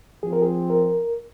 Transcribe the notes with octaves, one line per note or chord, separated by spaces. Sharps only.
F3 C4 F4 G#4
A#4
G#4
A#4